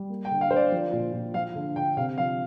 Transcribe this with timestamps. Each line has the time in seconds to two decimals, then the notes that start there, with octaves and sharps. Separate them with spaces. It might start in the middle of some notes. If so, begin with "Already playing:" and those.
Already playing: G3
0.10 A#3
0.25 G5
0.31 D3
0.41 F5
0.51 D3 C5
0.56 D5
0.72 F3
0.93 A#2
1.13 A#2
1.34 F3 F5
1.55 D3
1.76 D3 G5
1.97 C3 F5
2.18 F3 F5